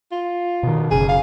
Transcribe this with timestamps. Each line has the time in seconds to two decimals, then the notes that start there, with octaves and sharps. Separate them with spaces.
0.12 F4
0.63 B2 D#3
0.91 F#1 C#3 G#4
1.09 F5